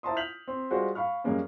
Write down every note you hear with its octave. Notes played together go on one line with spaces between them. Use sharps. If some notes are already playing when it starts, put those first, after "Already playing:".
E4 C5 A5 A#5 C6 D#6
F6 G6 B6 F7 F#7
C4
G3 G#3 F4 F#4 C5
F5 B5 C#6 F6
F#2 G3 G#3 A#3 C#4